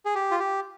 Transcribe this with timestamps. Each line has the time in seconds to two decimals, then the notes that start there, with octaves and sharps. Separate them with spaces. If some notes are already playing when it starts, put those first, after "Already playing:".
0.05 G#4
0.15 G4
0.31 F4
0.39 G4